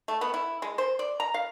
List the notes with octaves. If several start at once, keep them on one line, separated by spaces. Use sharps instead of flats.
A3
B3
E4
G#3
C5
D5
A#5
F5